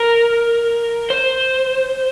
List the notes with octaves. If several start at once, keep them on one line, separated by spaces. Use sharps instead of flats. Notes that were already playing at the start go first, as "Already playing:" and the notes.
Already playing: A#4
C5